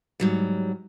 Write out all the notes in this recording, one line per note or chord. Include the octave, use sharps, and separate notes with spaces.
G#2 F#3 G3